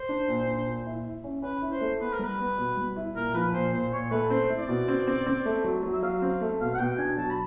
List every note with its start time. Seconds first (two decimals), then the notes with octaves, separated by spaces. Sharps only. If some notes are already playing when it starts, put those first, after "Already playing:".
Already playing: C5
0.09 D4
0.28 A#2
0.47 D4
0.66 A#2
0.86 E4
1.05 E4
1.24 C#4
1.43 C#4 B4
1.62 E4
1.72 C5
1.81 A3
2.00 B3 B4
2.12 A#4
2.19 G3 B4
2.39 B3
2.58 B2
2.77 G3
2.96 E4
3.16 A#2 A#4
3.34 F3 B4
3.53 A#2 C5
3.73 A#2 C5
3.92 A#2 C#5
4.11 A3 B4
4.30 C4 C5
4.50 E4
4.59 D5
4.68 B2
4.88 C4
5.07 C4
5.26 C4
5.45 A3
5.64 F#3
5.83 F#3
5.93 E5
6.03 F#3 F5
6.22 C4
6.41 A3
6.60 B2 F5
6.74 F#5
6.79 B2 G5
6.98 D4 G#5
7.18 F#3 A5
7.30 B5